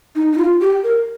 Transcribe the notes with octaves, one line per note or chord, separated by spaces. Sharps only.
D#4
D#4
F4
G4
A#4